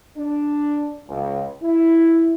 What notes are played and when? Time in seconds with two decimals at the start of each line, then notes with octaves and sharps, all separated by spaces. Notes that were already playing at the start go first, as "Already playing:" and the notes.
0.18 D4
1.08 C#2
1.62 E4